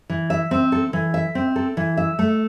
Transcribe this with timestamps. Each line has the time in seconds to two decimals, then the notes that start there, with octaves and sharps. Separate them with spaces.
0.10 E3
0.30 E5
0.51 C4
0.72 A4
0.93 E3
1.14 E5
1.35 C4
1.56 A4
1.77 E3
1.97 E5
2.19 A3